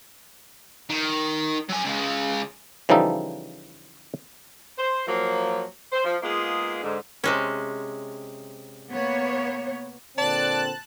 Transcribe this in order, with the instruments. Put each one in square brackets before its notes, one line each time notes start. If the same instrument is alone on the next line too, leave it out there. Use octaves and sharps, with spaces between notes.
[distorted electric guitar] D#3
F#3 G#5
C#3 G#3
[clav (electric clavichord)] C#3 E3 F3 G3 D#4 A4
[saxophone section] C5
F3 F#3 A#3
C5
F3
G#3 A#3 B3 D#4 F4 G#4
G#2 D3
[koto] C3 G#3 C#4
[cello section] A#3 B3 C#5
[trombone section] A#2 D3 C4 [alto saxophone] D5 [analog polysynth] A5 F#6